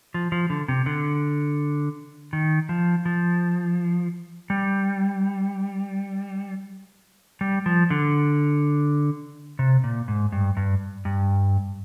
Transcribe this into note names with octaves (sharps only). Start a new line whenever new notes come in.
F3
F3
D3
C3
D3
D#3
F3
F3
G3
G3
F3
D3
C3
A#2
G#2
G2
G2
G2